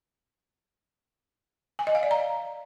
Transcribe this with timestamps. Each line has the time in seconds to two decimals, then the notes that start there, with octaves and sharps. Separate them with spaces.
1.79 G#5
1.87 D#5
1.95 F5
2.03 D5
2.11 A#5